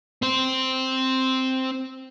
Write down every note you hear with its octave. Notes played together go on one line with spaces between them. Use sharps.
C4 C5